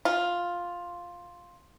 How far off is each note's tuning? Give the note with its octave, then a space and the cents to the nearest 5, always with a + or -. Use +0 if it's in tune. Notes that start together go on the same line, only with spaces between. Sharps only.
F4 +5